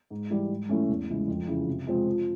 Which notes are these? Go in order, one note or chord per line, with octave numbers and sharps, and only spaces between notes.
G#2
E3 G3
G#2
E3 A3 C#4
E2
C#3 E3 G#3
F2
C#3 E3
C3
F3 G#3 C4
F3